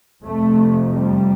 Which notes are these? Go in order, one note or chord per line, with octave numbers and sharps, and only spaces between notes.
F2 C3 A3
G3